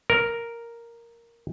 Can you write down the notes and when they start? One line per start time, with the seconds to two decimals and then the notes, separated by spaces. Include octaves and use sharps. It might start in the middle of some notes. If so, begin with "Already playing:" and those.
0.10 A#4